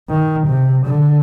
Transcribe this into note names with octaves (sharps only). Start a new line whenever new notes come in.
D#3
C3
D3